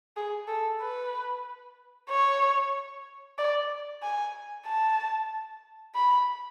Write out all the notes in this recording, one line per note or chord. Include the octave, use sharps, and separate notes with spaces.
G#4
A4
B4
C#5
D5
G#5
A5
B5